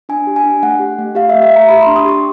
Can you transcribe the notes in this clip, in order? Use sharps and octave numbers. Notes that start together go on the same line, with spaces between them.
D4 G#5
G4
G#5
D4
A3 F#5
G4
A3
G4 F5
E5
A3
E5
A3
A#5
G4 B5
C6
D4
D#6
G4 C#6